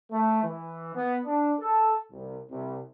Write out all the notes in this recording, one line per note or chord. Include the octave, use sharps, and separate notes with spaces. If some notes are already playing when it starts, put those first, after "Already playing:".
A3
E3
B3
D4
A4
C2
C2